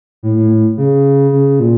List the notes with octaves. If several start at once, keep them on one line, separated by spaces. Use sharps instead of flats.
A2
A2
A2
C#3
C#3
A#2